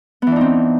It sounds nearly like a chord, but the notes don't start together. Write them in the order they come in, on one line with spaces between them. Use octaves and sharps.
B3 E3 D4 D#4 C4